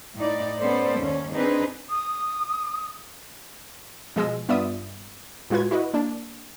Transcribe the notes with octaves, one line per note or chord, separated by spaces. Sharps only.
A2 D#4 D5
B3 C#4 A4 C5 D5
D#2 C#4
C4 D4 D#4 G#4 B4
D#6
B2 F3 G#3 G#4 D#5 E6
G2 B3 F4 D5 E5 D#6
A2 G#3 F4 F#4 B4 G#6
E4 F#4 B4 D#5
A#3 D4